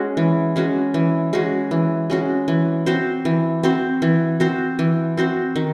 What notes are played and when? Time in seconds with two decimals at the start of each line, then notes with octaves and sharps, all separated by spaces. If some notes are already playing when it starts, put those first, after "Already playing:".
Already playing: G#3 C#4 F#4
0.17 E3
0.56 G#3 C#4 F#4
0.94 E3
1.33 G#3 C#4 F#4
1.71 E3
2.10 G#3 C#4 F#4
2.48 E3
2.86 C4 F#4 C5
3.25 E3
3.63 C4 F#4 C5
4.02 E3
4.40 C4 F#4 C5
4.79 E3
5.17 C4 F#4 C5
5.56 D#3